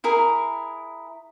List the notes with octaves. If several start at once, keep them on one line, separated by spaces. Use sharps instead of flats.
E4 G#4 A#4